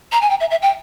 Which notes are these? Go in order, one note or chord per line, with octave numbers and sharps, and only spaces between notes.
A#5
G#5
G5
E5
E5
G5